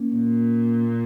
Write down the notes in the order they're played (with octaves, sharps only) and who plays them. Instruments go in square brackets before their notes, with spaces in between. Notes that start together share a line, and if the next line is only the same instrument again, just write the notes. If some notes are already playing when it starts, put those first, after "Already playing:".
Already playing: [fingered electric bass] A#3 C#4
[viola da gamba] A#2